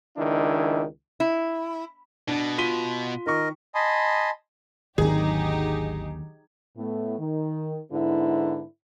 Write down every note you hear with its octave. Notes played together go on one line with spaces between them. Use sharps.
C#2 D#3 D4 E4
E4
B2 D4
F4 B6 D#7 G7
D#3 A#4 D#5 C#6
D#5 G#5 A5 B5 C6 D#6
G#1 D#2 D3 F#3 D#4 G4 G#4
A2 A3 B3
D#3
G#2 D3 B3 E4